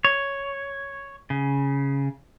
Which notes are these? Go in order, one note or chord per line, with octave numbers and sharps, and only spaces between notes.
C#5
C#3